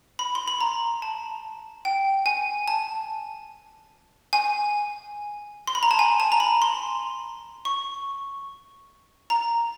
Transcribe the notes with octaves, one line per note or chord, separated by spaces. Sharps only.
B5
C6
B5
A#5
A5
G5
G#5
A5
G#5
C6
B5
A#5
A5
G#5
A5
A#5
B5
C6
C#6
A#5